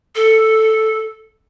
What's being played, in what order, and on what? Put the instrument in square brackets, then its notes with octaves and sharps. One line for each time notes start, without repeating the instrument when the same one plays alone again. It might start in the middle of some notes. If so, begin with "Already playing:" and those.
[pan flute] A4